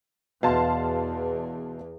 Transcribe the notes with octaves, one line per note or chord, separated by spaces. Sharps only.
E2 B2 F5 A5 C6